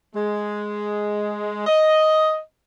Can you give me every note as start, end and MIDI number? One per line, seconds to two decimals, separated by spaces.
0.15 1.63 56
1.67 2.40 75